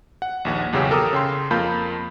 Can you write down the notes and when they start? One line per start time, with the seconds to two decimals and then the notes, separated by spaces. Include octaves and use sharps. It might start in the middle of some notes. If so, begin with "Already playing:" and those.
0.22 F#5
0.45 A#1 D#2 F#5
0.72 B1 E2 C#3 C#4 G4 E6
0.91 A4 A#4 G5 A#5 D6 D#6
1.13 C#3 G5 C6
1.51 F2 A#3 F4 A5 B5 G6